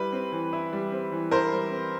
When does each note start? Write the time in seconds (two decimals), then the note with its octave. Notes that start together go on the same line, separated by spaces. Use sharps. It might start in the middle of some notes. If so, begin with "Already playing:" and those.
Already playing: G3 E4 B4
0.13 C4
0.32 E3
0.53 E4
0.73 G3
0.92 C4
1.12 E3
1.31 E4 A#4 C5
1.52 G3
1.71 C4